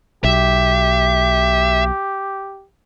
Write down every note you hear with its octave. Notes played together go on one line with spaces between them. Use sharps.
B1 G4 E5